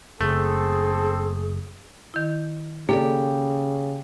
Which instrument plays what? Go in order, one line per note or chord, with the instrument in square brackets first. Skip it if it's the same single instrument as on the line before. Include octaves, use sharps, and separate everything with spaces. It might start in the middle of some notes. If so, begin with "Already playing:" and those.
[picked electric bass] F#1 [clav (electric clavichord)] A3 [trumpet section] C4 A4 [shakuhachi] G#4
[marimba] D#3 E4
[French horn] C#3 [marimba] A#3 A4 D5 [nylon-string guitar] G4